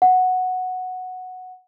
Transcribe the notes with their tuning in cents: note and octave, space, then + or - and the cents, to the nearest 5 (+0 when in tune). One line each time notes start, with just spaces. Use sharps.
F#5 -5